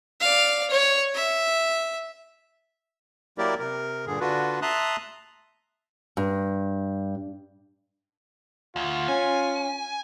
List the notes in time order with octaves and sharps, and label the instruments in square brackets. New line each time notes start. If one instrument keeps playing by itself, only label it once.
[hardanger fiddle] D5 F5
C#5
E5
[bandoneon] F#3 A#3 E4 G4 A#4 D5
C3 A#4
G2 A#2 D3 G#4
D3 D4 F4 F#4 B4
E5 A5 A#5 C6 D#6 F#6
[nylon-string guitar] G2
[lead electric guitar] D2 [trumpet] F4
[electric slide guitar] C#4 [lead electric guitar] G#5